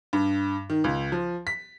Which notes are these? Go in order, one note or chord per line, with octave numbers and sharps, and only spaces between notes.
G2
D#3
C#2
F3
B6